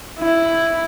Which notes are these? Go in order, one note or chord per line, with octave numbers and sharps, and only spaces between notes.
E4